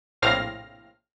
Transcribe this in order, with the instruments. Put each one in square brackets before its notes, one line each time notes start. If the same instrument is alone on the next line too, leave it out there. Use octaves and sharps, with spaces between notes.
[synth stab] A#1 A2 C3 F5 F6 A#6